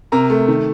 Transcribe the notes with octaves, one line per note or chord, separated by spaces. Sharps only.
C3 A#4 A#5
A3
D#3